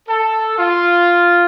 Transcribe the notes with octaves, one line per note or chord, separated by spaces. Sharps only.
A4
F4